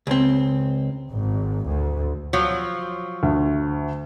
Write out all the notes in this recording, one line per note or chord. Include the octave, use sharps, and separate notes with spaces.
C#2 C4
G#1
D2
F3 F#3
D2